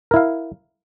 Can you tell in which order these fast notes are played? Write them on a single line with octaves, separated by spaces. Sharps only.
A#4 E4 F5